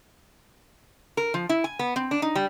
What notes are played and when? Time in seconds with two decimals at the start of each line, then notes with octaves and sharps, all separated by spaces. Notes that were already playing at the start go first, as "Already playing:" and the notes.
1.17 A#4
1.34 F3
1.49 E4
1.64 G#5
1.79 B3
1.96 C4
2.11 D4
2.22 D#4
2.36 G3